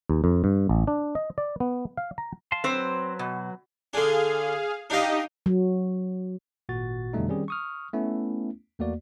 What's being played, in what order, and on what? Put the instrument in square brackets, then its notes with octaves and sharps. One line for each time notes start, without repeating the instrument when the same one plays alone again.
[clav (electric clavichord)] D#2
F2
G2
A1
D4
D#5
D5
B3
F5
A#5
[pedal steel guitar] F5 A5 C6
[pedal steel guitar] F#3 B4 [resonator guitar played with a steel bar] C4 C5
[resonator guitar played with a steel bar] B2
[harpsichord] D3 D4 [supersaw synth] G#4 F5
[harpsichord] D4 F5 [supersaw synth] D#4 G4 D#5
[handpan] F#3
[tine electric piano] G#1 A#2 F#4 A6
F2 B2 D3 G3 A3 D#4
D#3 G3 C4 C#4 G#4
C#6 D#6 F6
A3 B3 C#4 E4
E2 A3 A#3 F#4 D5